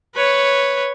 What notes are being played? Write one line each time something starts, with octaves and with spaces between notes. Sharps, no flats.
B4 C#5